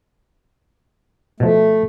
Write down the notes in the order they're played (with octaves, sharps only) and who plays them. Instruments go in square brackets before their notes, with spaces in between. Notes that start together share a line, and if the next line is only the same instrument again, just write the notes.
[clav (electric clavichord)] B2 F3 [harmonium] A3